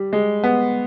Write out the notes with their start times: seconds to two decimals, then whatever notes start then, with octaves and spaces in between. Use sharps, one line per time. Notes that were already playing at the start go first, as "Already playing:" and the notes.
Already playing: G3
0.13 G#3
0.43 B3